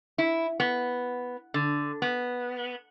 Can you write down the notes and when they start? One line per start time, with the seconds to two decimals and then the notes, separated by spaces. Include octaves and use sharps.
0.18 E4
0.60 B3
1.54 D3
2.02 B3